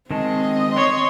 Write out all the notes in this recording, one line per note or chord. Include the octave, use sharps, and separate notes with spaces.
D#3 G#3 C4 D#5 A5
C#5 C6